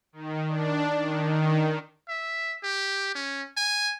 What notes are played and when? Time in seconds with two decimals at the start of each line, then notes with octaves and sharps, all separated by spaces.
0.13 D#3
0.48 D4
0.99 D#3
2.09 E5
2.63 G4
3.15 C#4
3.57 G#5